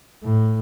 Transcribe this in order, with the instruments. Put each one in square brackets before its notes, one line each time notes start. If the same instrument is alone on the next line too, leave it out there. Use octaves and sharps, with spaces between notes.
[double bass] A2